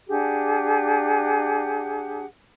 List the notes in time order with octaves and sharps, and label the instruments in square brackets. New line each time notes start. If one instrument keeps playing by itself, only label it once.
[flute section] D4 G4 G#4 F#5